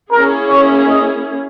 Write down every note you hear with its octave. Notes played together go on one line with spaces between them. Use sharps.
A#3 C#4 E4 G#4 A#4
C#5
D#5